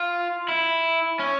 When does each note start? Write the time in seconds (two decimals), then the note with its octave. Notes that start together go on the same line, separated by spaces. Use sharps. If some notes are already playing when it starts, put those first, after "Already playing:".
Already playing: F4
0.49 E4
1.19 C#4